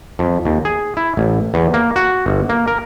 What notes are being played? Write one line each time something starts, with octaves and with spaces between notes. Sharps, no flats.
F2
D#2
G#4
E4
A1
E2
A#3
F#4
G1
A#3
A#4